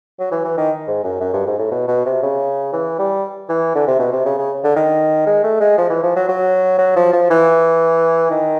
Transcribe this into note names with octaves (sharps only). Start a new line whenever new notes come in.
F#3
E3
E3
D#3
G#2
F#2
F#2
G2
G#2
A2
B2
B2
C3
C#3
E3
G3
E3
D3
C3
B2
C3
C#3
C#3
D3
D#3
G#3
A3
G#3
F3
E3
F3
F#3
F#3
F#3
F3
F3
E3
D#3